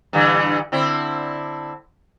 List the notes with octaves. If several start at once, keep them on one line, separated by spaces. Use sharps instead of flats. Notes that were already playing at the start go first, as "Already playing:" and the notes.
G2 D3 E3
D3 C4 E4